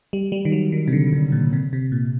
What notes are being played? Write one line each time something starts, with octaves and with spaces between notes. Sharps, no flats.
G3
G3
D#3
F#3
D#3
C3
D3
C3
A#2
C3
C3
A#2